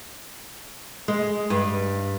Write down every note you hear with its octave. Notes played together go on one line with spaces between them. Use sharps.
G#3
G2